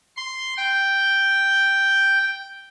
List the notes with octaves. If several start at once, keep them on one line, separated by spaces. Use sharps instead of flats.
C6
G5